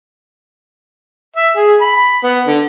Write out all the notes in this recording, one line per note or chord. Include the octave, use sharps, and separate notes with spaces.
E5
G#4
B5
B3
D3